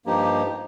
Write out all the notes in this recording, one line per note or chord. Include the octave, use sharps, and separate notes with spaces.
G2 F3 A#3 D#4 G4